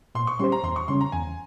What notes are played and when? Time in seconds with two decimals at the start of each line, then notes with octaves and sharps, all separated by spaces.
0.15 A#2 C6
0.27 C#6
0.39 G3 C#4 G4 C5 C6
0.52 A#5
0.63 E2 C6
0.76 C#6
0.88 C#3 G3 C#4 C6
1.01 A#5
1.12 E2 G#5